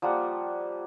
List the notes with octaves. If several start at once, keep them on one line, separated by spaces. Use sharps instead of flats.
F3 G3 A#3 F#5